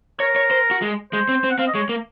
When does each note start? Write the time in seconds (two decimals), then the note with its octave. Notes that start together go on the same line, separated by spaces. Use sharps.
0.20 A#4 C#5
0.36 C#5
0.51 C5
0.71 F#4
0.82 G#3
1.12 G#3 C5
1.29 C4
1.44 C4
1.51 F#5
1.59 C4 F5
1.67 D#5
1.74 G#3 C#5
1.89 A#3